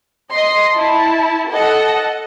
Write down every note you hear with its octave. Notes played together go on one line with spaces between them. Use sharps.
D#5 C6
E4 A5
A4 D#5 F#5